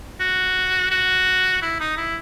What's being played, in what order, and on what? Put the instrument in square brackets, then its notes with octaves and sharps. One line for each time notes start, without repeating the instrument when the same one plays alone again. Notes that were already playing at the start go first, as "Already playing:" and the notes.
[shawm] F#4
F#4
E4
D#4
E4